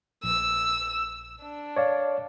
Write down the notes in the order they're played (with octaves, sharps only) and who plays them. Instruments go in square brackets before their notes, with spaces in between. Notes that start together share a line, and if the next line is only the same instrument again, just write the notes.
[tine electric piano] A#1 [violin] E6
[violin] D4
[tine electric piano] C#5 D5 F5